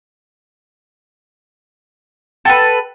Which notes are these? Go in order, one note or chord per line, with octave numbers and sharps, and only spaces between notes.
A4 B4 F#5 G5